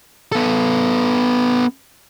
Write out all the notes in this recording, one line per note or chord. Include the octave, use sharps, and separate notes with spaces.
B3 A4